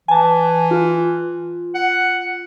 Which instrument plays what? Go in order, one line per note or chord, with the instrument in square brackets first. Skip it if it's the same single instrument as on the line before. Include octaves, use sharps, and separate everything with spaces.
[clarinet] E3 [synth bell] G#5 A5
[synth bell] F4
[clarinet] F#5